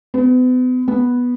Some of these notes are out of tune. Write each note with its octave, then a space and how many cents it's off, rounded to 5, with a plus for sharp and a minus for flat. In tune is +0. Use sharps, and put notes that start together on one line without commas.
B3 +40
B3 -5